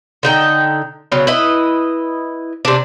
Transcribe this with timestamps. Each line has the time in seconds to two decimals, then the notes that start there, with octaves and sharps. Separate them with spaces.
0.23 D3 D#4 G5
1.12 C#3 F#3 B3
1.27 E4 B4 D#5
2.65 C3 D4